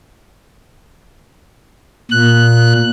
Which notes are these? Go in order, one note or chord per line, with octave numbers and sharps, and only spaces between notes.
A#2 F#6